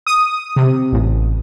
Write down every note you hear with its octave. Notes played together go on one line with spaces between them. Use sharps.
D#6
C3
A1